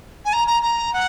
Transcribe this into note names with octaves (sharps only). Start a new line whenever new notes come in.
G#5
A#5
A#5
A#5
F#5